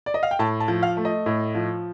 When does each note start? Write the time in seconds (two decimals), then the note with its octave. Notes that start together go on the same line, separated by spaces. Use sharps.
0.06 D5
0.14 D#5
0.23 F5
0.31 G5
0.39 A2 A5
0.60 A5
0.68 F3
0.83 F5
0.97 A3
1.05 D#5
1.26 A2
1.55 F3